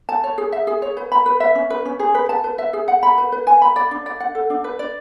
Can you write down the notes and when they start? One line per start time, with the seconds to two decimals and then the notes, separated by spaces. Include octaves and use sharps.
0.09 A5
0.24 C#5
0.38 G#4
0.52 E5
0.67 G#4
0.82 C#5
0.97 B4
1.12 B5
1.26 B4
1.40 E5
1.55 C#4
1.70 B4
1.85 C#4
1.99 G#4
2.15 B4
2.29 A5
2.44 B4
2.58 E5
2.73 G#4
2.88 F#5
3.03 B5
3.18 B4
3.32 B4
3.47 G#5
3.62 B5
3.76 D5
3.91 D4
4.06 D5
4.20 F#5
4.35 A4
4.50 D4
4.64 B4
4.79 D5